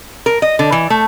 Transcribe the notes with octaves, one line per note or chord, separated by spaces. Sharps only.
A#4
D#5
D3
E3
A3